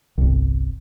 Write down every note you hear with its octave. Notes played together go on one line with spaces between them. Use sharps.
G1 C2